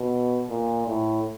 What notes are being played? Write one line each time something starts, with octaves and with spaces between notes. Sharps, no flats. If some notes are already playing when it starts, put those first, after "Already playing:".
Already playing: B2
A#2
A2